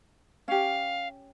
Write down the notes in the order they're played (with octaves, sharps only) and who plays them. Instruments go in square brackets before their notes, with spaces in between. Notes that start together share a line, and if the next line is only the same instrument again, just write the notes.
[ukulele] C#4 G4 [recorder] F5